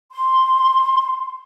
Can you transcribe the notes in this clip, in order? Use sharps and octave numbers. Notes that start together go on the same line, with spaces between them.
C6